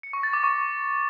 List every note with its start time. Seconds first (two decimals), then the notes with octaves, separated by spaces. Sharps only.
0.03 C#7
0.13 C#6
0.23 A6
0.33 D6
0.43 C#6